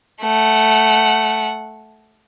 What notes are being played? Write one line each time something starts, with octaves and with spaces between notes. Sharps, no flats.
A3 F#5